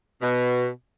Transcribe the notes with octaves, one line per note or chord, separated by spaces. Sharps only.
B2